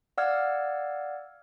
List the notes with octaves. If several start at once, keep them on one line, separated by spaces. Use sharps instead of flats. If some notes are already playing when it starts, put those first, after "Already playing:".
D5 F5 F#5 E6 F6 G#6